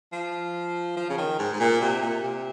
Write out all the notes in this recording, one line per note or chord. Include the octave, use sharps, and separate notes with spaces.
F3
F3
C#3
D#3
G#2
G#2
A#2
C3
A#2
C3